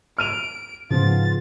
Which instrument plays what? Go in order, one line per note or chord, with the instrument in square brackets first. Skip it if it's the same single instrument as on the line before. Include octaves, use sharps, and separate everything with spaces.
[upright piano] F6 D#7 F7 [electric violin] D7
[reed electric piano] G#2 [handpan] C#3 B3 [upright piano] F3 [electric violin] F4 A6